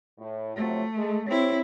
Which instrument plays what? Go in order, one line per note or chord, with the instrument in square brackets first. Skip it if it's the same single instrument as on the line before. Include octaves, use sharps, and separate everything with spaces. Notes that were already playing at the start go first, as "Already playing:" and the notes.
[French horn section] A2
[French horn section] C3 F3 F#3 [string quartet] A3
[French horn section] G#3 G#4 A4
[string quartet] C4 E4 [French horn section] G4 C5 C#5